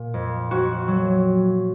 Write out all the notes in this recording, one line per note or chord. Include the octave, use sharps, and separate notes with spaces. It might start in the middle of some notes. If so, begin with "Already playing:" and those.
Already playing: A#2
F2
F2 F#4
F#3